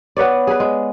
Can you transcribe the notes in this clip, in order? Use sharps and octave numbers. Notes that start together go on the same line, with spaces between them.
B3 B4 C#5 D5
G#4 B4
G#3